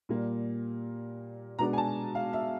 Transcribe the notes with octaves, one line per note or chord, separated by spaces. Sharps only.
A#2 G3 A#3
B2 G#3 B3 D4 A#5
G#5
A5
F5
E5